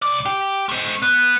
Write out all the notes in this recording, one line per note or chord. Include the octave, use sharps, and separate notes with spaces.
C2 D5
G4
A3 C4
B3